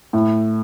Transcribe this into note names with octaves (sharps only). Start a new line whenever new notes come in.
A2